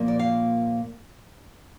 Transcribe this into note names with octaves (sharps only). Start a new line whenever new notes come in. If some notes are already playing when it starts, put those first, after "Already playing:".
Already playing: A#2 F3 A#3
D5
F5